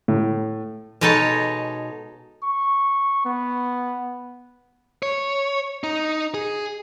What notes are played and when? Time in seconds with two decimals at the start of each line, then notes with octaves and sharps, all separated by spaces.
0.08 A2
1.01 B2 G#3 D#4 A4 C#5 A5
2.43 C#6
3.25 B3
5.03 C#5
5.84 D#4
6.34 G#4